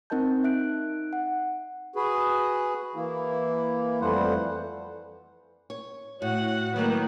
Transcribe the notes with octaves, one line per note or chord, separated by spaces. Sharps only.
C4 D#4 A#4 D#5 A5 G6
D#4 E5 F#6 D7
F#5
F#4 G#4 B4
E3 A#3 E4
F2 E3 G3 A3 C5 F#5
C#5
A2 F#4 F#5
D#3 F#3 A3 A#3 B4